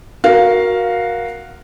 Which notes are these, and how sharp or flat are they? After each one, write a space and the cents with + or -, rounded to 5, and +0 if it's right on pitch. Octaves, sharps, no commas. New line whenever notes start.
F#4 -5 A#4 +10 F5 +0